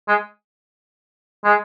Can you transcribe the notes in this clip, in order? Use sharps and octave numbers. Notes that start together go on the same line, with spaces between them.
G#3
G#3